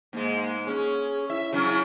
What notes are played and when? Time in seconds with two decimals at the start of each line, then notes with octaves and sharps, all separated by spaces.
0.13 G#2 G#3 A#3
0.67 C#4 G#4
1.30 E4 E5
1.53 C#3 F#3 C#4